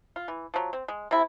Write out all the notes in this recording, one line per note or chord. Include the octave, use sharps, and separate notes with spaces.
F4
E3
F3 F#3
C4
G#3
C3 E4